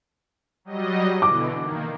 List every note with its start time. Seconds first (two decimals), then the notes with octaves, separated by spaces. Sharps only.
0.65 F#3 G3 D#5
1.22 B2 D3 E3 D6
1.62 D#3 A#3